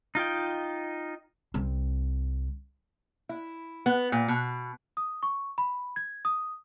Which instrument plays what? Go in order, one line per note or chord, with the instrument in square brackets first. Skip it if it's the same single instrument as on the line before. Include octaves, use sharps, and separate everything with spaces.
[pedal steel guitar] D#4 F4 D#5 G5
[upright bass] C2 C4
[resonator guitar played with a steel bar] E4
B3
A#2
B2
[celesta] D#6
C#6
B5
G#6
D#6